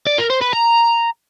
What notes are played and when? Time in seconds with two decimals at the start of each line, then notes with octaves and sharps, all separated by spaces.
0.07 D5
0.18 A#4
0.30 C5
0.41 B4
0.53 A#5